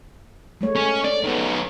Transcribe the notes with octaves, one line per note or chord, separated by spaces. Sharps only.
G#3 A3 C#5
C#4
C#4 D5
D#3 B3